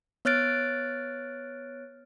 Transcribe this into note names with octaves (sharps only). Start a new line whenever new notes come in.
B3 C#5 F6 F#6 A6 D7